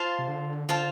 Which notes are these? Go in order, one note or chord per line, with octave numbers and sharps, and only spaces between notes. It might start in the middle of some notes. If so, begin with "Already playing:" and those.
Already playing: F4 C5 F5 A5
C3
D3
D3 F4 C5 F5 A5